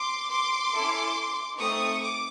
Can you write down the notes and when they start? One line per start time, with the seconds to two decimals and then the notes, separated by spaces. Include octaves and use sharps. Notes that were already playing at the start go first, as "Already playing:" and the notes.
Already playing: C6 D6
0.29 C6 D6
0.72 C#4 E4 A4
1.58 A3 C4 D#4 C#6 D#6
2.00 D6